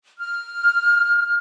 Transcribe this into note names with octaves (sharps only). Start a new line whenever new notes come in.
F6